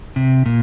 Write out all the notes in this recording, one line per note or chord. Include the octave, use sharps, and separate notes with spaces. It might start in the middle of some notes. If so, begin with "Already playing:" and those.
C3
A#2